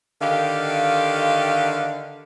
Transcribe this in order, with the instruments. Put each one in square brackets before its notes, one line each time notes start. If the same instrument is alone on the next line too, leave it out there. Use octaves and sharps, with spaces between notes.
[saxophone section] D3 D#3 G4 F5